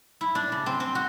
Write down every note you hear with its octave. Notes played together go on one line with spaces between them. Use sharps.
E4
D4
C#3
C4
C4
F#4